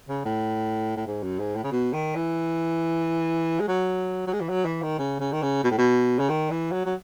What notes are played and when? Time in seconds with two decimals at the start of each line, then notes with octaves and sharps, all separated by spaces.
0.09 C#3
0.25 A2
0.96 A2
1.07 G#2
1.23 F#2
1.39 G#2
1.56 A2
1.64 C#3
1.72 B2
1.93 D#3
2.15 E3
3.60 G#3
3.68 F#3
4.27 F#3
4.33 G#3
4.41 E3
4.49 F#3
4.65 E3
4.82 D#3
4.99 C#3
5.20 C#3
5.32 D#3
5.42 C#3
5.64 B2
5.71 A2
5.78 B2
6.19 C#3
6.29 D#3
6.50 E3
6.72 F#3
6.86 F#3